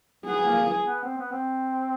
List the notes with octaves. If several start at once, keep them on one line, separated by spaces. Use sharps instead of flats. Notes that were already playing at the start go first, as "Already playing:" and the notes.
B3 G#4
A#3
B3
C4
B3
C4